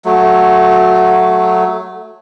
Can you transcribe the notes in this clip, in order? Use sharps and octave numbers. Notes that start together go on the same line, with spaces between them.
F#3 A3